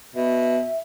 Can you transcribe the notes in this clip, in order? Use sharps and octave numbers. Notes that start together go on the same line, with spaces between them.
B2 E5